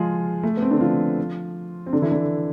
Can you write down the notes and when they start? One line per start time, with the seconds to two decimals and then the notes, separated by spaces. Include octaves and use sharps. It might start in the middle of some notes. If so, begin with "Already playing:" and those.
Already playing: F3 G#3 F4 G#4
0.43 A3 A4
0.57 B3
0.62 C4
0.71 D3 D4
0.81 F3 F4
1.86 C4
1.93 D3 D4
2.02 E3 E4
2.11 D3 D4